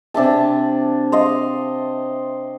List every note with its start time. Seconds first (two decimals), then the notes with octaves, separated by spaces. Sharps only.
0.14 C3 D4 E5 A5
1.12 C5 D#5 F5